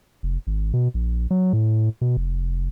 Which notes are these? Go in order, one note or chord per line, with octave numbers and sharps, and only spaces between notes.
F1
G#1
B2
A#1
F#3
A2
B2
F1